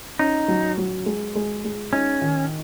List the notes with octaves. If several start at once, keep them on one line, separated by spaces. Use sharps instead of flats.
C#4 D#4
F#3
F#3
G#3
G#3
G#3
C#4 D#4
D#3